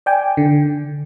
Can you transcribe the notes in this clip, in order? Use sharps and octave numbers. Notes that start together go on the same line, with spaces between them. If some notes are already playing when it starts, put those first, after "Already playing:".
D5 G5 G#5
D3